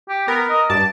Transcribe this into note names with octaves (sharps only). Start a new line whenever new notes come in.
G4
B3 A#4
D#5
G2 D5 A5